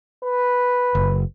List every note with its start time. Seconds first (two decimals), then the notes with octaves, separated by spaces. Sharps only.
0.24 B4
0.95 F#1